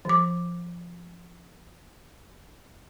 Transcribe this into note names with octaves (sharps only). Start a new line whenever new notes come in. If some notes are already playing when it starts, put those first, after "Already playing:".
F3 D6